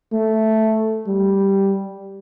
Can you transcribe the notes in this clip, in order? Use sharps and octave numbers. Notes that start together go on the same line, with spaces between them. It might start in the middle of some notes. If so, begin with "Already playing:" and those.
A3
G3